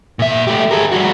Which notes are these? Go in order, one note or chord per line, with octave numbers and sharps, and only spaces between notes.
A#2 E5
A3 G4
G#4 A#4
G3 F#4